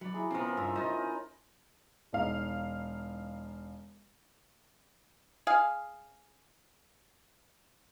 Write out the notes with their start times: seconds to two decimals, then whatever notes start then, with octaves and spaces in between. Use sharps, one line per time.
0.01 F#3 D5 B5
0.13 E4 G#4 A#5
0.31 C#3 F3 B3 C4 A#4
0.57 G2 A3 F4 D#5 E5
0.76 D#4 F4 C5 C#5 D#5
0.97 C#4 B4
2.13 E1 D#4 F5
5.47 G#4 F5